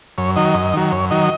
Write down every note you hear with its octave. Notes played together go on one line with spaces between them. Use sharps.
F#2 C#5
D#3 F#3 D#5
F#2
D#3 F#3
F#2 C#5
D#3 F#3 D#5